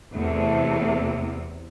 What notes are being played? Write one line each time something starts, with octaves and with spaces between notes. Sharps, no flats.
E2 C3 A3